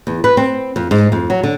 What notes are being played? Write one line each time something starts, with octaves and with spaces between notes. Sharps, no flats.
E2
B4
C4
F2
G#2
F2
F#3
D3